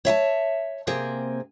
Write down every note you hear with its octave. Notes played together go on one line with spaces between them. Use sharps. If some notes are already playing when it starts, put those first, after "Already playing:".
C#5 E5 G#5 A5
C3 A#3 C4 G#4